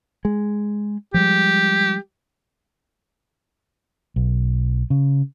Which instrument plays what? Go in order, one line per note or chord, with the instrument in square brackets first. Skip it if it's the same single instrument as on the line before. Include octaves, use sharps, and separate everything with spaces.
[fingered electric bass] G#3
[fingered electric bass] F3 G3 G#3 [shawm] G4
[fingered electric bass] B1
C#3